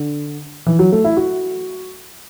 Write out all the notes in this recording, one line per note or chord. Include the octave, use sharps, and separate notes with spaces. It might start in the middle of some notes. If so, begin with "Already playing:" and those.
Already playing: D3
E3
F#3
A3
E4
F#4